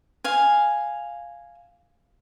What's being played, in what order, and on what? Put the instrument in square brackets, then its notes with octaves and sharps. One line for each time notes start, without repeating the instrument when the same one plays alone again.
[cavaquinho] F5 G#5